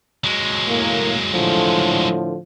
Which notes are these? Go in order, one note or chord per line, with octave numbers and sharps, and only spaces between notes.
F#3 G#3
A2 A#3
A2 D3 F3